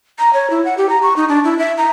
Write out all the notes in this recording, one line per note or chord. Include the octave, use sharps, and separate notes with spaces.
A#5
C#5
E4
F#5
G4
A#5
C#6
D#4
D4
E4
E5
A#5